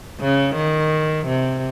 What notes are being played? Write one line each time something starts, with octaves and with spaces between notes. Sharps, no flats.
C#3
D#3
C3